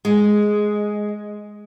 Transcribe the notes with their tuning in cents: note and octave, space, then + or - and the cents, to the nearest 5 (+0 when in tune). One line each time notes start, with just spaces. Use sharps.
G#3 +5